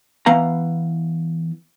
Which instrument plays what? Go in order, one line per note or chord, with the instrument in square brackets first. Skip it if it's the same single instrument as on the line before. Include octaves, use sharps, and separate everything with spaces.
[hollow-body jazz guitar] E3 B3 F5 A#5